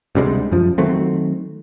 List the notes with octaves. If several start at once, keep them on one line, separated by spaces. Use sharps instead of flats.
D2 C3 G3 G#3
F#2 F3
D#3 F#3 A3 C4